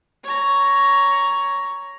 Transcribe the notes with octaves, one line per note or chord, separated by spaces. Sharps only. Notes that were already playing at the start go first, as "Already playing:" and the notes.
C#5 A#5